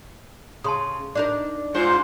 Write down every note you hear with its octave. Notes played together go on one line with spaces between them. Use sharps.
C#3 A5 C6 D#6
D4 D#4 A#4 D5
G#2 F4 C5